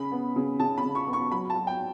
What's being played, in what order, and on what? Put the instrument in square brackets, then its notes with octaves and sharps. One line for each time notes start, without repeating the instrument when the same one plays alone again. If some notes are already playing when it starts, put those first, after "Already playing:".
Already playing: [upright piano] C#3 B5
B3
C#3
C#3 A5
B5
C#3
C#6
B3
C#6
F#3 B5
A5
F#3
G5